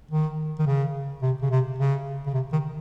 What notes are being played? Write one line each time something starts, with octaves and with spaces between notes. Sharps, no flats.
D#3
D#3
C#3
C3
C#3
C3
C#3
C#3
C3
D#3